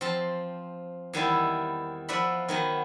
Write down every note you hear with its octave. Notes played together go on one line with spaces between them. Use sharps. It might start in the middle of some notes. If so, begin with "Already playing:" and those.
F3 C4 A5
E2 D#3 G3 E4
F3 B4 D5 E5 F#5 B5
D#3 F#3 B3